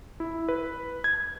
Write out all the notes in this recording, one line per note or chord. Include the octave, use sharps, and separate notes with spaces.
E4
B4
G#6